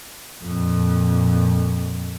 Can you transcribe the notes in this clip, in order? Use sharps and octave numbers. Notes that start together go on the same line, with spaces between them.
F2 A#2